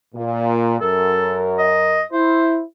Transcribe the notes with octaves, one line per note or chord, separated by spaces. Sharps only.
A#2
F#2 A4 A#4
D#5
E4 C5